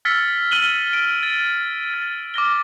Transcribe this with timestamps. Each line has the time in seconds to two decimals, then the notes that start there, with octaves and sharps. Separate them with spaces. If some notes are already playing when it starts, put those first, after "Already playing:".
0.05 E6 F6 A6 B6 C#7
0.51 F6 B6 D#7 F#7 G7
0.93 D7
1.23 A6
1.94 A6
2.34 D6 F6 A#6 G7